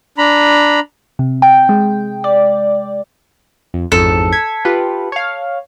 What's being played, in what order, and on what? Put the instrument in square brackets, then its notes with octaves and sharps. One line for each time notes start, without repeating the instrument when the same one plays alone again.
[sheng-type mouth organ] D4 A#5 B5
[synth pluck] C3
G5
G#3
D5
[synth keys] F2
[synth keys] A1 F2 G#2 [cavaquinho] A4
[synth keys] G#6 B6
F4 G4 B4
C#5 F5